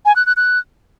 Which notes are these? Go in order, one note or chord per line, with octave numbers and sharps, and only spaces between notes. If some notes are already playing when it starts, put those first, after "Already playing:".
G#5
F#6
F#6
F#6